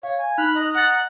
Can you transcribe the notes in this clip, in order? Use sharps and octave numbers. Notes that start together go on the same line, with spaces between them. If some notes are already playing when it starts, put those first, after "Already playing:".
C#5 F5
G#5
D#4 B5 F6 F#6
D#5 A#5
F#5 F#6 A6